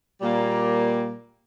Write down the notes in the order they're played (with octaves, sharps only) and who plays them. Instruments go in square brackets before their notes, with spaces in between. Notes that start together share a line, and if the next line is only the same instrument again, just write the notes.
[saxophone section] A#2 G3 A#3